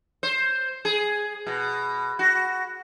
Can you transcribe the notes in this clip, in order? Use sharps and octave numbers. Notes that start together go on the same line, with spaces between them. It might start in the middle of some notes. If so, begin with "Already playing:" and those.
C5
G#4
B2
F#4